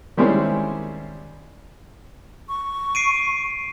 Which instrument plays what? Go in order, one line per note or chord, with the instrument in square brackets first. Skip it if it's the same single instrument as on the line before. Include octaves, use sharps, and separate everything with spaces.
[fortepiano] D#3 G3 G#3 C4 C#4 E4
[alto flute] C#6
[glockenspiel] C7 D7 D#7